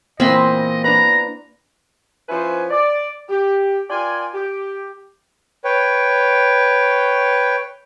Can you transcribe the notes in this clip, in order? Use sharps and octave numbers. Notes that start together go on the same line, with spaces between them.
A#2 E3 C4 D#5 B5 C6
D4 B4 A#5
F3 C#4 E4 B4 C5 G#5
D5
G4
F4 A#4 D5 G5 G#5
G4
B4 C#5 G5